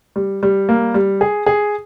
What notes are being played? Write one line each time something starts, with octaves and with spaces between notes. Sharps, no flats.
G3
G3
A#3
G3
G#4
G#4